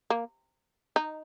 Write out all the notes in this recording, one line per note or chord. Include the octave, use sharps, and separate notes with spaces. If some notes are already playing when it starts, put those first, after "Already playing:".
A#3
D#4